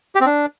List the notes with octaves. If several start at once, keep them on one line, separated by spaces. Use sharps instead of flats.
G4
C4
D4